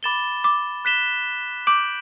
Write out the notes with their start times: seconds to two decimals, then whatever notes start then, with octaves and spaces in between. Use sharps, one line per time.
0.03 B5 D6 A6 E7 G7
0.44 D6
0.85 F#6 B6 E7 G7
1.67 D6 G6 D7 F#7